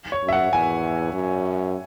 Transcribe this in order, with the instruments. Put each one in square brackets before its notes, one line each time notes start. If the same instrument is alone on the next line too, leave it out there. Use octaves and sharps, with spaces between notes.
[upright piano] C#5
[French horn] F#2
[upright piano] E5
F#5
[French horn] E2 [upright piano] G#5
[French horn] F#2